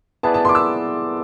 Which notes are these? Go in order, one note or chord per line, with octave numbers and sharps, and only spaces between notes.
B3 E4 G#4 B4 D5 A5
A5
C6 D6
E6